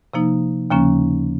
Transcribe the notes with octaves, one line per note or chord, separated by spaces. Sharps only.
C3 F3 A#3 D#4
D#2 C#3 F3 A#3 C#4